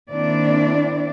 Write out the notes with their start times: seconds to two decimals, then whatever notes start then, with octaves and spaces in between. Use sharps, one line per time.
0.11 D#3 A#3 C4 D4 E4 D5